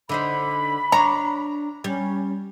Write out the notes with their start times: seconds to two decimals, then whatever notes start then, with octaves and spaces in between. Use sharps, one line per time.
0.09 D3 D#4 C5 B5
0.92 D4 C#5 A#5
1.84 G3 C#4